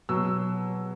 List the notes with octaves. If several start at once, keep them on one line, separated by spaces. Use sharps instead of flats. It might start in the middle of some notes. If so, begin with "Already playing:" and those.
B2 F#3 E6